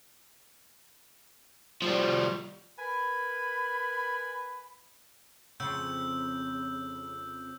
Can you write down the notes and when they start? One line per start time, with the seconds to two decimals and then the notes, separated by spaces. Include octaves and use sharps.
1.82 F3 G3
2.79 A#4 B4 G#5 B5
5.60 F2 C#3 E6 G6